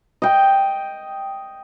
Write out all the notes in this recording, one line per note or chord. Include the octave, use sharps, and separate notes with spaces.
D#5 G5